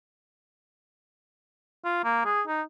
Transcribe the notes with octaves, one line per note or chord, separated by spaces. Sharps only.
F4
A#3
G#4
D#4